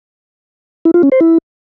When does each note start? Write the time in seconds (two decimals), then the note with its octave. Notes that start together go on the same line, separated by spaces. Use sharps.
0.85 E4
0.94 F4
1.03 C#4
1.12 C5
1.21 E4